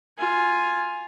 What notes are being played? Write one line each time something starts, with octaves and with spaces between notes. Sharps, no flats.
F4 G#5